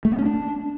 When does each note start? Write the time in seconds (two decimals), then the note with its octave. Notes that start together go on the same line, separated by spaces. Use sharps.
0.05 A3
0.12 B3
0.19 C#4
0.25 D4